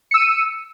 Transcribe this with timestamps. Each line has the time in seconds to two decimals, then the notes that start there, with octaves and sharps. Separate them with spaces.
0.11 C#7
0.14 E6
0.17 D#7